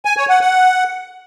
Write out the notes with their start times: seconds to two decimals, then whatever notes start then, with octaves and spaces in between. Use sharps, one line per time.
0.05 G#5
0.17 C#5
0.29 F#5
0.41 F#5